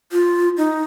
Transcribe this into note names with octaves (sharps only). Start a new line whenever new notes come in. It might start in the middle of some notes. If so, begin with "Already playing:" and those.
F4
D#4